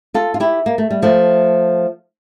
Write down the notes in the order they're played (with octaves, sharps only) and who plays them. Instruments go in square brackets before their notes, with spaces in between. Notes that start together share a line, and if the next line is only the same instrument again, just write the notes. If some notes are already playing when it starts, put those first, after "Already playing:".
[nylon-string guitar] F4 A4
F4
E4 G4
A#3
A3
G3
F3 A3